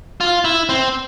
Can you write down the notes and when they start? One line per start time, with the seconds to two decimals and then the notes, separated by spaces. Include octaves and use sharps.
0.20 F4
0.45 E4
0.69 C4